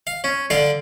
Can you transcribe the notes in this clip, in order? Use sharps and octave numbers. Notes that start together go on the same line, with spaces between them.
F5
C#4
D3 D4 F5